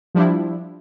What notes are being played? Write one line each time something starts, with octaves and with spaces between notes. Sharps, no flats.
F3 G3 D4 E4